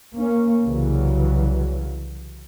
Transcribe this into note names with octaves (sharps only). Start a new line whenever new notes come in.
A#3 C#4
C2 C#3 E3 F#3